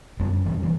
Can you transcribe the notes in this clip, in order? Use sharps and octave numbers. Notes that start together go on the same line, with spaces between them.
F#2 G3 B3
F#2 E3 G3
E3